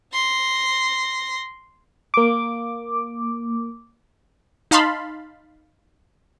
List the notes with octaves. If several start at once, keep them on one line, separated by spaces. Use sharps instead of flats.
C6 A#6
A#3 D6
D#4 F5 A5 B5 C6